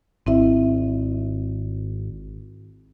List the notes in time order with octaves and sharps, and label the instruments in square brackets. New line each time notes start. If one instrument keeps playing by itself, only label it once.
[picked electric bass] G#1 [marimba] C4 E4 E5